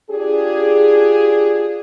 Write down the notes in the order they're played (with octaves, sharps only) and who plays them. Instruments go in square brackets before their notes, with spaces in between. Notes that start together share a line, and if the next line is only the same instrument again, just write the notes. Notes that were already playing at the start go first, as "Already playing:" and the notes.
[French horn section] D4 F4 G4 G#4